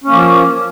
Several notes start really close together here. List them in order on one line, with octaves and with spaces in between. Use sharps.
C#4 A#3 F3